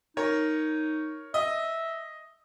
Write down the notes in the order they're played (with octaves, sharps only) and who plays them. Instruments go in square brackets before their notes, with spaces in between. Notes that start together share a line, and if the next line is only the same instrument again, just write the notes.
[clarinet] D#4 [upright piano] A#4 C#5
[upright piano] D#5 [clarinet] E5